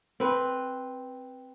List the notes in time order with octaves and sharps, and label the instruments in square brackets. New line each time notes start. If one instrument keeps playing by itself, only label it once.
[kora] C4 B4